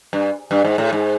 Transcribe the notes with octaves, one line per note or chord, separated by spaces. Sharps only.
G2
G2
G#2
A2
G#2